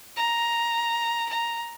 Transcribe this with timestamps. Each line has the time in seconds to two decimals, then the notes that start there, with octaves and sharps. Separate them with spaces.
0.17 A#5
1.29 A#5